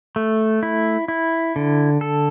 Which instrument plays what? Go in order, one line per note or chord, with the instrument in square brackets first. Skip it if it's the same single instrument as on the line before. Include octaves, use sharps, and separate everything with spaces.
[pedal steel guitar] A3
E4
E4
D3
A4